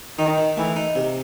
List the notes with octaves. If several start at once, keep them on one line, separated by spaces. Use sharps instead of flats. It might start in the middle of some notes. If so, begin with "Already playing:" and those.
D#3 D#4
D#3
E3 A3
D#4
C3